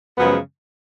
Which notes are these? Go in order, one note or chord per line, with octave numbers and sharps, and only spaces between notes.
F#2 C#3 F3 G#3 B3